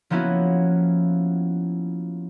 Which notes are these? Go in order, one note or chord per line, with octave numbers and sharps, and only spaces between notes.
F3 A#3 B3 C#4 E4 F#4